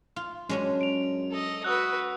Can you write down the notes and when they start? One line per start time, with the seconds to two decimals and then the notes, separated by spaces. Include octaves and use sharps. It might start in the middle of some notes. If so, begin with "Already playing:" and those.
0.16 F4
0.49 F#2 G#3 C#4 D4
0.81 D7 F7
1.31 A4 D#5
1.64 F#4 B4 D#6 E6 F#6